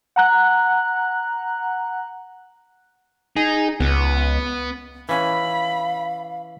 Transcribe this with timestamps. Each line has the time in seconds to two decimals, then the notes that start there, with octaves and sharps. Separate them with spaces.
0.16 F#5 A#5 F#6
3.36 D#4 G#4
3.80 C#2 B3
5.09 E3 C#4 F5 B5